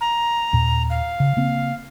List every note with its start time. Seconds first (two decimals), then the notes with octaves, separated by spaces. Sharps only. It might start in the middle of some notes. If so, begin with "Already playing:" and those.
0.01 A#5
0.53 D#2 A#2
0.90 F5
1.20 C#3
1.37 C#3 A#3 C4